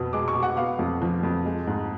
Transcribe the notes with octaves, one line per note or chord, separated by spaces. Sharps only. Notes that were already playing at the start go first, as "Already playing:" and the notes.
Already playing: F2 B2 B3
G#3 D6
C#6
B2
F#5
B3 F5
F2
F3
F2
G#3
G#2